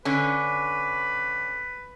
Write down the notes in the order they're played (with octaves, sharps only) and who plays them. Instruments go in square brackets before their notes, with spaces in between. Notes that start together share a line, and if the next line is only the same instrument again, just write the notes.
[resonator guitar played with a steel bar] D3 C#4 [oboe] B4